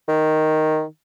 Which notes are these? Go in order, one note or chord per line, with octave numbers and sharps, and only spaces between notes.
D#3